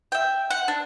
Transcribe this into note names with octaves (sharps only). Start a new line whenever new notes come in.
E5 G5
F#5
D4